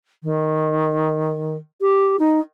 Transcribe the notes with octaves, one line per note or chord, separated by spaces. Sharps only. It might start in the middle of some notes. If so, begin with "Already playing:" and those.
D#3
G4
D#4